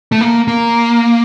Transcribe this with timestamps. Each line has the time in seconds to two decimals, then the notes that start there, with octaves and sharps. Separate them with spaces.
0.12 A3
0.21 A#3
0.48 A#3